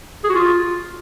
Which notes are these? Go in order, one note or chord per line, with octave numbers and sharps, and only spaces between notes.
G#4
F#4
F4